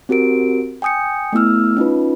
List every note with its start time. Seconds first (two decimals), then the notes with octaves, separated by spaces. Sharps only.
0.09 C4 F#4 G4 A#4 D7
0.82 G5 G#5 D#6 G6 C#7
1.33 A3 B3 E4 E6 F6
1.77 C#4 D#4 F4 B4